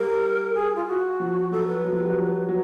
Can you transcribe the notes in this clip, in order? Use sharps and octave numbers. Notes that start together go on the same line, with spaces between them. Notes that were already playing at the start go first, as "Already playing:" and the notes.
Already playing: G3 A#4
G#4
F4
F#4
F3
F#3 A4
B4
F#3
F3
G3
F#3
F3
F#3